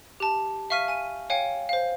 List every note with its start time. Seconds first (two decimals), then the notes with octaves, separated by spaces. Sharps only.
0.20 G4 A5
0.70 E5 F5 C#6 F6 B6 D#7
0.88 G#5 D#7
1.30 C#5 F5 G5 G#5 C#7
1.69 C5 F5